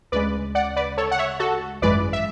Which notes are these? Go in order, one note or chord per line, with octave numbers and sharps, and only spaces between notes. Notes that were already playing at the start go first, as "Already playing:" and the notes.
D2 C#3 G#3 B4 D5
D5 F#5
B4 D5
A4 C#5
F#5
C#5 E5
F#4 A4
G#1 F#2 E3 G#3 B4 D5
E5